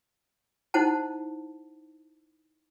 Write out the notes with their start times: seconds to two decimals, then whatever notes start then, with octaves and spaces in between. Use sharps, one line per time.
0.74 D#4 E4 C5 F#5 A5